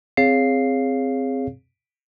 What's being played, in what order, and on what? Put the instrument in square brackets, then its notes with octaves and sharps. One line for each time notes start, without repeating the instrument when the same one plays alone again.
[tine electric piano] C4 G#4 C#5 F5 C7